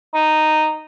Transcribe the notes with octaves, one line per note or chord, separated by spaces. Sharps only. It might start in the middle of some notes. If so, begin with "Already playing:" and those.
D#4